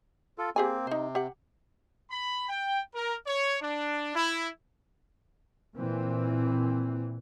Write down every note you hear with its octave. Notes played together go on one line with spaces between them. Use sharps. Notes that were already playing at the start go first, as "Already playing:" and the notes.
F4 A4
A#3 C4 G4 G#4 G#5
C3 D#4 C5
G4 F#5
B5
G5
A#4
C#5
D4
E4
A#2 E3 C4